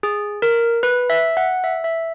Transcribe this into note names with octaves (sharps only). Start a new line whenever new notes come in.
G#4
A#4
B4
E5
F#5
E5
E5